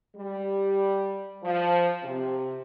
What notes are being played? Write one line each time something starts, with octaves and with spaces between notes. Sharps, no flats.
G3
F3
C3